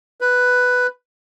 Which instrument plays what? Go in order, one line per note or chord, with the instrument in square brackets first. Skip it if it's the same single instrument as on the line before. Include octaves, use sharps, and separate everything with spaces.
[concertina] B4